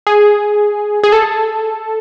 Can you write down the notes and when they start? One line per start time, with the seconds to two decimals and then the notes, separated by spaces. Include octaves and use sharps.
0.07 G#4
1.03 G#4
1.13 A4